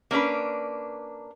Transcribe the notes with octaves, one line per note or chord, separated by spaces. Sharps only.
A#3 C#4 D4 B4